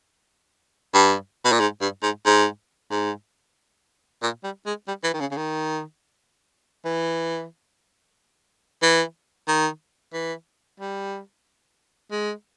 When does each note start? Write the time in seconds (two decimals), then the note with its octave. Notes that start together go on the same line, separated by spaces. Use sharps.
0.94 G2
1.45 B2
1.53 A#2
1.60 G#2
1.81 G2
2.03 G#2
2.26 G#2
2.91 G#2
4.23 A#2
4.44 G3
4.66 G#3
4.88 G3
5.04 E3
5.14 D#3
5.20 C#3
5.31 C#3
5.37 D#3
6.85 E3
8.82 E3
9.48 D#3
10.13 E3
10.80 G3
12.12 G#3